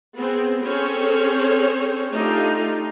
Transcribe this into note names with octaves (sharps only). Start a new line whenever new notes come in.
B3 C4 G#4
C4 C#4 G#4 A4 C5 C#5
A3 D4 D#4 F4 G4 A4